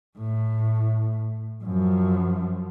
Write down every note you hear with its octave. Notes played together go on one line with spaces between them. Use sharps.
A2
F#2 F3